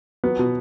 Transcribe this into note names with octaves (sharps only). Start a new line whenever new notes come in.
F#3 B3
B2